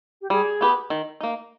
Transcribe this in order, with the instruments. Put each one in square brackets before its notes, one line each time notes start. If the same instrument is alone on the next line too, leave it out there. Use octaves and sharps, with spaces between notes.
[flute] G4
[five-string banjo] G3 [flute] G#4
[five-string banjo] B3 G4 B4
D#3
A#3 D#4